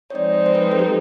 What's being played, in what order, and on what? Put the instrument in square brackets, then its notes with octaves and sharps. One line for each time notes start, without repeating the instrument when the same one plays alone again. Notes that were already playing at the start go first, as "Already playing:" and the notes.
[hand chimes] C#5
[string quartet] F3 G#3 C4 D#4 [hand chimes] D5
[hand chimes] C5
B4
A4
G4